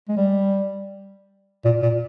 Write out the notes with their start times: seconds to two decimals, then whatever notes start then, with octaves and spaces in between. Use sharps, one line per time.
0.09 G#3
0.17 G3
1.65 A#2
1.82 A#2